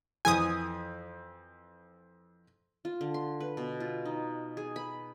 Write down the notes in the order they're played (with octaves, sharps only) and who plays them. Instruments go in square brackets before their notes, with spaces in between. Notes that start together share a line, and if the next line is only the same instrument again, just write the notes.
[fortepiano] F2 E3 [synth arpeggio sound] G#5 D#6
[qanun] F4
D3
C6
B4
B2
F4
D#4
G#4
B5